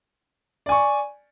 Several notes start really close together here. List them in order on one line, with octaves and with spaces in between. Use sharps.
D5 G#5 C#6